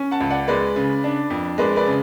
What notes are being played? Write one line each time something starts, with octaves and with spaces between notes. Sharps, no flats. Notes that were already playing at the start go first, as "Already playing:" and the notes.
Already playing: C#4
F#5 A5
C#2
D5 F#5
G#3 B4 D5
C#3
D4
F2
G#3 B4 D5
B4 D5
C#3